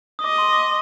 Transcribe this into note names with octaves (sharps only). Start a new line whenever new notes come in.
D#6
D#5 D6
C6
D6